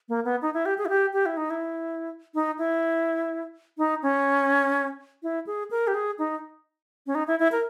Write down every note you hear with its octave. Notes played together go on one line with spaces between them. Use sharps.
A#3
B3
D#4
E4
G4
G#4
E4
G4
G4
E4
D#4
E4
D#4
E4
D#4
C#4
E4
G#4
A#4
G4
G#4
D#4
C#4
D#4
E4
E4
A#4